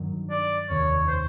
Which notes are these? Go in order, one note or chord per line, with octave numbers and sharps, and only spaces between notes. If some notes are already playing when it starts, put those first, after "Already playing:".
Already playing: G2 D#3 F#3
D5
F1 D#2 D#3 C#5
C5